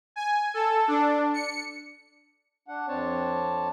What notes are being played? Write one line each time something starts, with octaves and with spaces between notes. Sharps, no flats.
G#5
A4
D4
C#7
D4 F#5
F2 C4 D4 C#5 A5